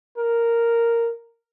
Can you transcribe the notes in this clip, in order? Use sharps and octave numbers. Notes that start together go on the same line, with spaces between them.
A#4